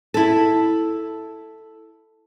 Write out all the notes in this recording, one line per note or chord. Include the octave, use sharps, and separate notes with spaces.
E4 A4